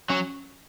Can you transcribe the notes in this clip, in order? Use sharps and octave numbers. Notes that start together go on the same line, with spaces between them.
F#3 C#4